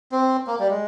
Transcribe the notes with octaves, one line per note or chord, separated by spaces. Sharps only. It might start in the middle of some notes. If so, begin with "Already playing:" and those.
C4
A#3
G3
G#3